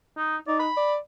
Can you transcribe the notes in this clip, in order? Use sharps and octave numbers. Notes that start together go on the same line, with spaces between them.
D#4
D#4 D5
B5
D5